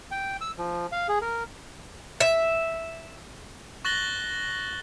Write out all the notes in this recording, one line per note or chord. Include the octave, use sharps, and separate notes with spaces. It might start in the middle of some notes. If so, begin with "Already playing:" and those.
G5
E6
F3
F5
G#4
A#4
E5
C#6 F#6 A6 A#6 F#7 G7